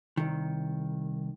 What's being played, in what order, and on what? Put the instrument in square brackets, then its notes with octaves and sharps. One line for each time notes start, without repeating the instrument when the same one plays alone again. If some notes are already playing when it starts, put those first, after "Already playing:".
[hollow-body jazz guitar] C2 D#3